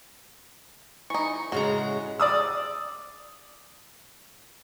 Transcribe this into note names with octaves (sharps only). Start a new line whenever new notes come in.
E3 D#4 C#6
A2 C#3 G#3 F#4 A#5
D5 D#6 E6